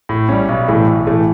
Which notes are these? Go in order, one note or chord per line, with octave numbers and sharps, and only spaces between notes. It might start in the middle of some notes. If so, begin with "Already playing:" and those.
A2
G3 C#4
B1
A2 E3 A3
B1
A2 E3 A3